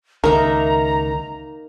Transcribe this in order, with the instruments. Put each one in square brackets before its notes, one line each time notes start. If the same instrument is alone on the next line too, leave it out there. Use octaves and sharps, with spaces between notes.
[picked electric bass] C#2 D#3 [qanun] A#3 D#4 E5 [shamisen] A#4 [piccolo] A#5